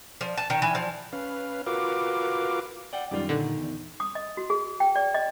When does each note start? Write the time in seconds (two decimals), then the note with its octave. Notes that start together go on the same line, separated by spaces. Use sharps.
0.21 F3
0.37 A5
0.50 D#3
0.62 E3
0.75 F3
1.13 C#4 B4 F5
1.66 F4 F#4 A#4 B4 F5 D6
2.93 D5 F#5 G5
3.11 F#2 D#3 G3 F4 D5
3.29 A#2 D3 D#3
3.58 E2
4.00 D#6
4.15 D#5
4.37 F#4
4.50 G#4
4.80 G5
4.96 D5
5.14 D#5